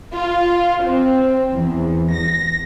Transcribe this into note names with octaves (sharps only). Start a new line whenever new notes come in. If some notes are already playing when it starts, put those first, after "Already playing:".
F4
C4
E2
A#6